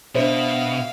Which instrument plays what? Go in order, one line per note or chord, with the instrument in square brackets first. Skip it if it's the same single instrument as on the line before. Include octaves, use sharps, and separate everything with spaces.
[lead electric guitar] B2 [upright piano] D4 C5 [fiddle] E5 F5